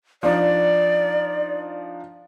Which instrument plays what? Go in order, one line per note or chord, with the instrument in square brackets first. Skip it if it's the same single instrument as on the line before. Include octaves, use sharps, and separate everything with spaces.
[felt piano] F3 D4 D#4 [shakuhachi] D5